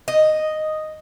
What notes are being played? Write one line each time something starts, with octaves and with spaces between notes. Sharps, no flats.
D#5